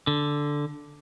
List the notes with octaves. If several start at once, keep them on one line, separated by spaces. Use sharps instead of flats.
D3